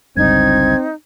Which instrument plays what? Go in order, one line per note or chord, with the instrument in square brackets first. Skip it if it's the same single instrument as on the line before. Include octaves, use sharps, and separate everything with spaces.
[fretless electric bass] G1 C#2 G2 [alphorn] C4 [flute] D#4 [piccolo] G#6